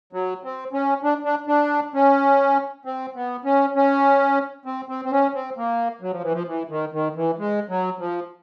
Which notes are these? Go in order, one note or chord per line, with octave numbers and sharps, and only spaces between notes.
F#3
C4
C#4
D4
D4
D4
C#4
C4
B3
C#4
C#4
C4
C4
C4
C#4
C4
A#3
F#3
F3
E3
F3
E3
D#3
D#3
E3
G#3
F#3
F3